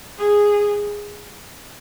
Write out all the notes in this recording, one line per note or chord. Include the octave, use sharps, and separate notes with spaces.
G#4